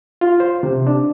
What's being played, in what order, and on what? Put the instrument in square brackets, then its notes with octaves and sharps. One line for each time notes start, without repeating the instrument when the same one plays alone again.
[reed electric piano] F4
C5
C3
D4